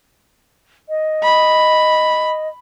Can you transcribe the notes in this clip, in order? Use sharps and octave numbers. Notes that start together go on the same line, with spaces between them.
D#5
B5